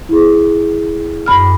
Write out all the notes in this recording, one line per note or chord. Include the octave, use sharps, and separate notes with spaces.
E4 G#4
F#2 B5 F6